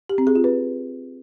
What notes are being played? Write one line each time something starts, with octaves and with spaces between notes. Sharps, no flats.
G4
C4
G#4
F4
B4